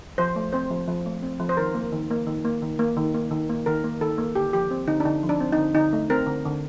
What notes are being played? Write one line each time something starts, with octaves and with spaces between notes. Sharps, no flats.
F3 C5
A3
C4 C5
F3
F3
A3
C4
F3
C5
D#3 A#4
A#3
D#3
A#3
D#3
A#3
D#3
A#3
D#3
A#3
D#3
A#3
D#3 A#4
A#3
D#3 A4
A#3
D3 G4
F3 G4
C4
D3 D#4
D4
D3 D#4
F3
D4
C4
D#4
D3
D3 D#4
A3
C4 A#4
D3
D3